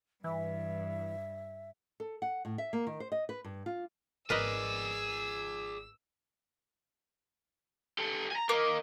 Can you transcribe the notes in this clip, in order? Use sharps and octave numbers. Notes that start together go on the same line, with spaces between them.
G2 E3 E5
A4
F#5
A2
E5
A#3
D#3
C5
D#5
B4
G2
F4
G#1 G#4 A#4 B4 D5 D#5 E6
G4 A4
G#5 A#5
A#3 A#4 D#5